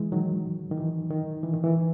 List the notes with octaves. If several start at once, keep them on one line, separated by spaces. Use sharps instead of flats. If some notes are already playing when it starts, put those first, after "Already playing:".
Already playing: E3 G#3
D#3 F#3
D#3
E3
D#3
E3
D#3
E3